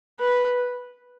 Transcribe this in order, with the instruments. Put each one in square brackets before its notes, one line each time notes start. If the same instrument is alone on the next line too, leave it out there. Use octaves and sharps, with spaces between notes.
[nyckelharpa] B4